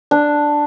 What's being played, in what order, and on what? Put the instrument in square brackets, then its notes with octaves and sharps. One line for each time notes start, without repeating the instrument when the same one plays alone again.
[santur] D4